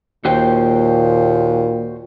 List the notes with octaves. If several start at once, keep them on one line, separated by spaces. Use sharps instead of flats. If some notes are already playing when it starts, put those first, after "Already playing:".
D#2 A#2 F#4 C5 G5